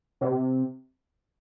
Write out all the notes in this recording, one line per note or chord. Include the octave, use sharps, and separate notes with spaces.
C3